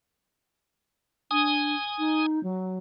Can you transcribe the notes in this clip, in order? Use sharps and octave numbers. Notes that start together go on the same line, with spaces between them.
D4 G#5 D#6
D#4
F#3